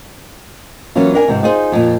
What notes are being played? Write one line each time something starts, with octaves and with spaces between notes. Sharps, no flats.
E3 F#3 A#3 C#4 F4
D4 A#4 F#5 G#5
G#2 C3 E3
D#4 F4 G#4 C5
F2 A#2